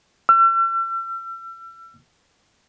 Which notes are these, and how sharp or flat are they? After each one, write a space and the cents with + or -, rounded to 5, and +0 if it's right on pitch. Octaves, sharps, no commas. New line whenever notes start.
E6 +40